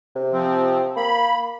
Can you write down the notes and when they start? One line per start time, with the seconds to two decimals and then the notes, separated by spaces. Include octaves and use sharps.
0.16 C3
0.33 F3 C4
0.97 A#3 B5